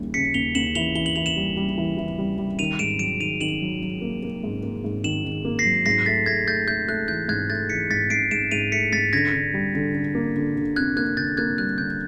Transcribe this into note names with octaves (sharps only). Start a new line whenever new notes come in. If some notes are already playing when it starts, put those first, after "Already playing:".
Already playing: D#2 C#3 E3 G3
C#3 B6 C#7
D#2 F7 G7
D#2 E7 F#7
E3 F7 G7
E3 G7
F#7
E3 F7
E7 F#7
G3
G3
E3
E3
G3
G3
D#3 D#7 F7
G#2 D7 E7
F#3 D7 E7
D#3 D#7 F7
D#3 E7 F#7
F#3
F#3
A#3
A#3
G#2
A#3
G#2
D#3 E7 F#7
D#3
A#3
A#6 C7
F#3
G#2 A#6 C7
A3 A6 B6
A3 G#6 A#6
A3 G6 A6
A3 G6
A3 F#6
E3 G6
G#2 F#6 G#6
A3 G6 A6
E3 B6 C#7
G#2 A6 B6
G#2 C7 D7
G#2 D7 E7
G#2 D#7 F7
A3 B6 C#7
G#2 A6 B6
D3 G#6 A#6
D3
G3
D3
D3
A#3
D3
D3
F2 F#6 G#6
A#3 F#6 G#6
D3 G6 A6
A#3 F#6 G#6
G3 F#6
D3 G6